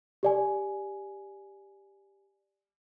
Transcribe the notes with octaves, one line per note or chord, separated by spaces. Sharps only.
G4 D5 G#5